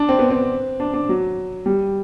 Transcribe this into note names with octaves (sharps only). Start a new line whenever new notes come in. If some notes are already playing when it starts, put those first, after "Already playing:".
Already playing: D4
C4
B3
C4
D4
D4
F#3
G3